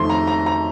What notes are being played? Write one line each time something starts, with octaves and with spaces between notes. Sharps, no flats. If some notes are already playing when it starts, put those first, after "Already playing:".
Already playing: F2 D#3 A3 C6
A#5
A#5
A#5